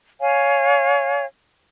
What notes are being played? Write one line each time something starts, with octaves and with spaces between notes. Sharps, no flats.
C#5 F5 G#5